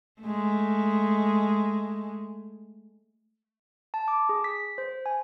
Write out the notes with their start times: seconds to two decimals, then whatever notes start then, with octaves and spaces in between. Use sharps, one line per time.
0.22 G#3 A3
3.94 A5
4.08 D6
4.29 G#4
4.44 B6
4.78 C5
5.06 G#5